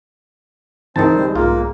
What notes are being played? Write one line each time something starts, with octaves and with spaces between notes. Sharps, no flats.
C#2 D#3 E3 C4 D#4 C5 A5
G3
B1 G#2 A#3 F4